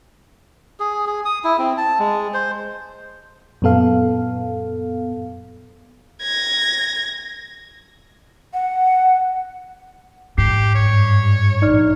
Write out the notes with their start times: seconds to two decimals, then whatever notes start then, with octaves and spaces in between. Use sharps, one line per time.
0.80 G#4
1.07 G#4
1.25 D#6
1.44 E4
1.59 C4
1.77 A5
1.99 G#3
2.34 C5
3.62 F#2 A#2 B3 A4 F5
6.22 G#6 A#6
8.54 F#5
10.38 G#2 G4 C7
10.75 G2 C#5
11.62 A#1 D#4 D5 F6